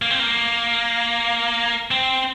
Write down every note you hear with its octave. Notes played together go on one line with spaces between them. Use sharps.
A#3
C4
A#3
C4